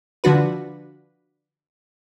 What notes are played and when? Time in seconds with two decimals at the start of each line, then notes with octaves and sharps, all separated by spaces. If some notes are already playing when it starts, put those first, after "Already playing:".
0.24 D3 F3 D4 F#4 B4